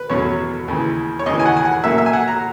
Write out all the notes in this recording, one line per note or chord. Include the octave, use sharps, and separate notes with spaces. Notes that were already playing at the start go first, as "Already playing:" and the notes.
Already playing: B4
E2 B2 F#3 C#4 C#5
D#2 C#3 E3
C#5
D#2 C#3 E3 D#5
G#5
F#5
G#5
F#5
A#2 F#3 A#3 C#4 E5
E5
G#5
F#5
A#5